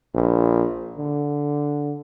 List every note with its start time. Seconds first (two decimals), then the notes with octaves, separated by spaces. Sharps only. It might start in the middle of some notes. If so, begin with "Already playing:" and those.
0.15 A#1
0.98 D3